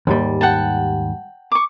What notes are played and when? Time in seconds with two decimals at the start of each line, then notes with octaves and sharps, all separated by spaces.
0.07 D#2 G#2 G3
0.41 F#5 G5 A5
1.52 C#6 D6